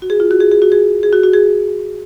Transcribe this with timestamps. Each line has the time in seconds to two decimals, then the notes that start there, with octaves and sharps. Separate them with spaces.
0.02 F#4
0.10 G#4
0.20 F4
0.31 F#4
0.40 G#4
0.51 G#4
0.62 F#4
0.72 G#4
1.03 G#4
1.13 F#4
1.24 F#4
1.33 G#4